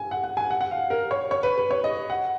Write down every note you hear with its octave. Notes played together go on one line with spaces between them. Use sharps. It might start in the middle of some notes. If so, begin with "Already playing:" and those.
Already playing: G#5
F#5
F#5
G#5
F#5
F#5
F5
A#4
C#5
C#5
B4
B4
C#5
D#5
F#5